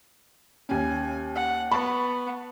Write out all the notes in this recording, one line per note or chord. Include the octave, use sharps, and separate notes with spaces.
D#2 C#4 G#5
F#5
B3 A5 B5 C#6